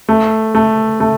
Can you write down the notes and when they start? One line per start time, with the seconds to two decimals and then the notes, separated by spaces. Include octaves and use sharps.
0.09 A3
0.55 A3
1.00 A3